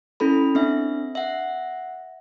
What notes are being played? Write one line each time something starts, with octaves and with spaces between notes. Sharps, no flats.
C#4 E4 A4 B5
C4 D4 E5
E5 F#5